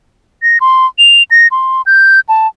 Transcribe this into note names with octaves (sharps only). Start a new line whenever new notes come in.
A#6
C6
F7
A#6
C6
G6
A5